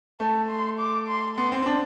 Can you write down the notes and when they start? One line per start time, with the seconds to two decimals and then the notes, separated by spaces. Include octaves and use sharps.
0.20 A3 A5
0.49 C6
0.79 D6
1.08 C6
1.36 B3 C6
1.52 C4
1.62 C4
1.66 D4